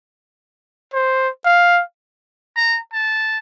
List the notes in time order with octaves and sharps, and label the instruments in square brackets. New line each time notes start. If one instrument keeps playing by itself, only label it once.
[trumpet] C5
F5
[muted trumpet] A#5
A5